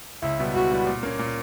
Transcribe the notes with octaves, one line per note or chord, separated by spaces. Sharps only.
C#2 E4
B2 G3 B3 E4
C#2 F#4
B2 G3 B3 E4
A#2
A#3 C#4
A#2